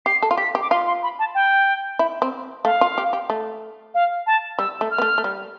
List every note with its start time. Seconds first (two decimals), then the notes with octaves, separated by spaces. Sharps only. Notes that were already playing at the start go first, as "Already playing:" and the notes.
0.06 G4 C7
0.22 A4
0.31 F4
0.37 G4 B6
0.55 G4
0.61 D6
0.70 F4 C6
0.86 C6
1.03 B5
1.19 A5
1.35 G5
1.99 E4
2.22 C4
2.64 A3 F5
2.81 F4
2.98 G4
3.13 G4
3.30 A3
3.94 F5
4.27 A5
4.58 G3 E6
4.81 A3
4.91 F6
4.98 B3
5.02 A3
5.18 A3
5.24 G3